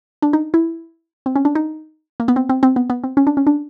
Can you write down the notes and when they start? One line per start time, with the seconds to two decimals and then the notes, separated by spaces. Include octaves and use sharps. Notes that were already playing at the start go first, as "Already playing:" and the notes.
0.22 D4
0.33 D#4
0.54 E4
1.26 C4
1.36 C#4
1.45 D4
1.55 D#4
2.20 A#3
2.28 B3
2.36 C4
2.49 C4
2.63 C4
2.76 B3
2.90 B3
3.04 C4
3.17 C#4
3.27 D4
3.37 C#4
3.47 D4